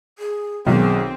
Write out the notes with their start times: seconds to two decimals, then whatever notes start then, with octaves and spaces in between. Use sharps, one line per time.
0.18 G#4
0.67 B1 D#3 C4 G#4